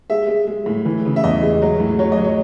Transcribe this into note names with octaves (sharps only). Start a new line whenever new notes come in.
G#3 E5
G#3
G#3
A2
E3
C#3
E5
E2 D#5
G#3
F#3
A2
F#3 C#5
D#5
F#3
C#5